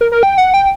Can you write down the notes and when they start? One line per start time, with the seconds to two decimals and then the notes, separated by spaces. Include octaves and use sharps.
0.01 A#4
0.12 A#4
0.23 G5
0.38 F#5
0.54 G5